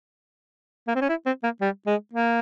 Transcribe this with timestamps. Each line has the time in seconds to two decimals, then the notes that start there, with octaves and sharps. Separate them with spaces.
0.87 A#3
0.95 C4
1.01 C#4
1.09 E4
1.26 C4
1.43 A#3
1.61 G3
1.87 G#3
2.13 A#3